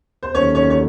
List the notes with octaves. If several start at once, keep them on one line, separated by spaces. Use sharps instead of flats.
C5
D#2 D3 F#3 C#4 C#5
C#4 C#5
C#5